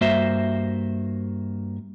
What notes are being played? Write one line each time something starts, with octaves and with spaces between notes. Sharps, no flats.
G2 A#3 F#4 C5 E5